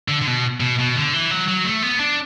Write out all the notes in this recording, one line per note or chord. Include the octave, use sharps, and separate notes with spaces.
D3
D3
B2
B2
B2
D3
E3
F#3
F#3
A3
B3
D4